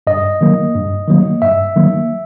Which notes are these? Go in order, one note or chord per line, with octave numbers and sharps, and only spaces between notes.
G2 D#5
D#3 F#3 A#3
G2
D#3 F#3 A#3
G2 E5
D#3 F#3 A#3